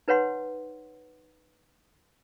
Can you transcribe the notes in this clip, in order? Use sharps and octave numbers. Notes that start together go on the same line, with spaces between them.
D#4 B4 C#5 F#5 C6